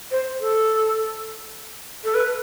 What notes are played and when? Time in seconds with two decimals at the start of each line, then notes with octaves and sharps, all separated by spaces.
0.11 C5
0.40 A4
2.04 A4
2.14 B4